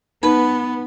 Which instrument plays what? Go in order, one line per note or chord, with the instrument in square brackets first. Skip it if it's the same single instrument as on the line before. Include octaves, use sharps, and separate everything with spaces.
[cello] B3 [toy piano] D#4 [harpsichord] B4